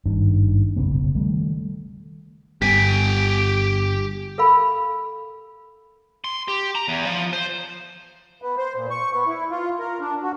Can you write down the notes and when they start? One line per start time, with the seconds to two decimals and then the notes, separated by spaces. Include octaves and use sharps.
0.06 G#1 G2 D#3 D4
0.76 F1 B1 C#3 B3
1.15 D#3 G3 A3
2.62 G1 G4 G#5 B6 D7
4.38 A4 A#4 F5 B5
6.24 C6
6.48 G4
6.75 A#5
6.88 E2
7.06 F3
7.33 C5
8.42 B3
8.58 C5
8.76 A#2
8.90 C#6
9.13 B3
9.27 E4
9.50 F4
9.79 A#4
10.01 D4
10.22 F#4